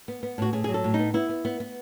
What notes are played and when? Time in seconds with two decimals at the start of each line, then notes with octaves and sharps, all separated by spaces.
0.08 B3
0.23 B3
0.38 A2 F#4
0.53 A2 G#4
0.64 F#3 G#4
0.74 A4
0.84 A2
0.94 D#4
0.99 B3
1.14 B3 E4
1.29 B3
1.45 B3
1.60 B3